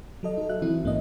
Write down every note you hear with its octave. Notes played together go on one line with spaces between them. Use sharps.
F#3 A4 D#5
D#4 A4
F#4 E5 F#6
E3 C4 E4
A#1 G#2 A#3 C#4 D#5